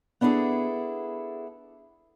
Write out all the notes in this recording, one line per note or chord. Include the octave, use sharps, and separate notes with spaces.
B3 D4 E4 G#4 A4